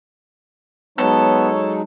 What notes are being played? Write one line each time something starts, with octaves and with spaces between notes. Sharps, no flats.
F#3 G#3 B3 D#4 A4 C#5